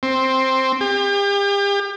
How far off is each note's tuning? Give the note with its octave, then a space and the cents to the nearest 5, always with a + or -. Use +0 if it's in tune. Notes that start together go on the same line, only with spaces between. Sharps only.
C4 +5
G4 +40